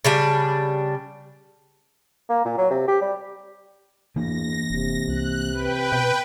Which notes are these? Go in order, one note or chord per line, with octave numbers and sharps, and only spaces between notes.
C#3 G3 D4
A#3
A#2
F#3
C3
G4
G3
E2 E3 A#3 D4 A#6
F1 C3
C2 F#6
B4 G5
B2